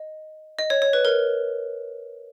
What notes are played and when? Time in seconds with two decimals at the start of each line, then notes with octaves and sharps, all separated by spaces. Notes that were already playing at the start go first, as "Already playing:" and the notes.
Already playing: D#5
0.59 D#5
0.70 C#5
0.82 C#5
0.93 B4
1.05 A#4